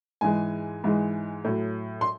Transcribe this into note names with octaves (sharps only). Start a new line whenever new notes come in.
G#2 E3 G#3 G#5
G#2 E3 G#3
A2 F#3
C6